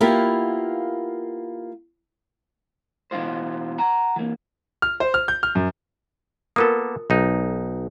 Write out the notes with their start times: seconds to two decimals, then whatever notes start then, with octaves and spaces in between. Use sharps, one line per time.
0.01 A#3 B3 E4 F4 G4
3.11 B2 E3 F#3 E4 F4 C5
3.78 F#5 A#5
4.16 E3 A#3
4.82 F6
5.00 C5
5.14 F6
5.28 G6
5.43 F6
5.55 F#2
6.56 A#3 B3 F4 A4 A#4 D#6
7.10 B1 D#4